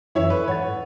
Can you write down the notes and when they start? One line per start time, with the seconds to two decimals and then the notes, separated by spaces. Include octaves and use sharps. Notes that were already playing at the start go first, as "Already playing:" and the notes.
0.15 F#2 E3 E4 C#5 E5
0.30 A4 B4 D5
0.48 G#2 C#5 F#5 A6